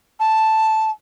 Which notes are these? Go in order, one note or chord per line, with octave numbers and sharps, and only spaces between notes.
A5